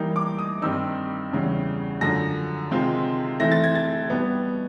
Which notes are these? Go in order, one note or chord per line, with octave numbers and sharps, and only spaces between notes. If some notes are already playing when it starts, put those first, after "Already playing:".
Already playing: E3 G3 A#3 D#4
D6
D#6
G2 D#3 G3 C4 D#4 E6
E2 C#3 E3 G3
F#2 D3 F3 A#6
C3 D#3 G#3 C4 F4
E3 A3 C4 E4 A#6
A6
G#6
A6
B2 G3 B3